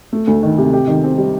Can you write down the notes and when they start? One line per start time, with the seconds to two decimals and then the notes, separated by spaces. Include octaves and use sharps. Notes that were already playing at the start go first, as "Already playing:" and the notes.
0.13 A3
0.27 D2
0.43 D#3
0.58 C3
0.73 G4
0.87 D#3
1.04 C4
1.18 G3